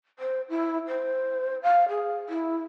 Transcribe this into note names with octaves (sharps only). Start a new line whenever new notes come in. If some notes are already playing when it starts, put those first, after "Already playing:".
C5
E4
C5
F5
G#4
E4